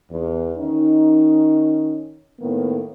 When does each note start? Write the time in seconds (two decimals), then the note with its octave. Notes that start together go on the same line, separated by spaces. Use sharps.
0.11 E2
0.58 D#3 C#4 D#4
2.40 A2 D#3 A#3 B3